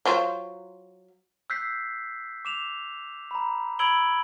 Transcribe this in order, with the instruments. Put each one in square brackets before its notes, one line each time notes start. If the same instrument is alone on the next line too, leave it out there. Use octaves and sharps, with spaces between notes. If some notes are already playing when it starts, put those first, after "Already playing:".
[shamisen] F#3 F4 C5
[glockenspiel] E6 F#6 G6 B6 C7
D6 E7 F7
A#5 B5
B5 E6 G#6 D7 F#7 G7